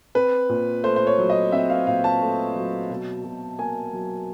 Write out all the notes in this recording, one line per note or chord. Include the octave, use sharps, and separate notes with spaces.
C4 B4
A#2
A3 C5
C5
C#5
F#3
D#5
C4 E5
F5
A#2 F5
A5
A3
F#3
B2
B2
A#3 G#5
F#3